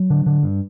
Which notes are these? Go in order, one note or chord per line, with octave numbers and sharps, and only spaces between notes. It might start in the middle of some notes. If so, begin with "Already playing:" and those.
Already playing: F#3
D3
D3
G2